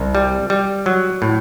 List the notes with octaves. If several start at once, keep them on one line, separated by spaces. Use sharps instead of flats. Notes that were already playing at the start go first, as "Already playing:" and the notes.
Already playing: C2
G3
G3
F#3
A2